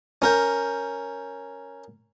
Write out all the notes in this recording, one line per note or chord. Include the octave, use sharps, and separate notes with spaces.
C#4 A#4 G5